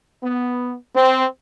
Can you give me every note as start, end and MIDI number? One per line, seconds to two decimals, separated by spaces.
0.22 0.74 59
0.96 1.24 60